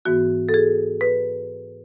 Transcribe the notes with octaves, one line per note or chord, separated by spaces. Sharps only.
G#2 E3 B3 F#4
A4
G#4
B4